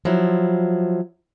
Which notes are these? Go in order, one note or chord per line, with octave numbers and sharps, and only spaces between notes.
F3 F#3 E4